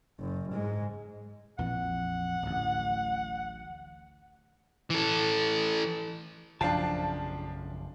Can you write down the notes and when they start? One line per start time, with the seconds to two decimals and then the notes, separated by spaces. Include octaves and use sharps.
0.19 F#1 F#2
0.51 G#2 G#3
1.58 A#1 F2 E3 F#5
2.42 D1 A1
4.90 E3 A4
6.61 A#1 F#2 C#3 F3 D4 F5 G5 A5